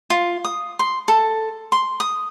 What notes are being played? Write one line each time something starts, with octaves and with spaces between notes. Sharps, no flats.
F4
D#6
C6
A4
C6
D#6